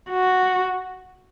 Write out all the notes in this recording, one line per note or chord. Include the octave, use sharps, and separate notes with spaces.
F#4